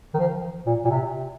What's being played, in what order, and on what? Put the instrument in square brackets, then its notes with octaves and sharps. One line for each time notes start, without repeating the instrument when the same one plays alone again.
[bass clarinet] D#3
F3
A#2
A#2
C3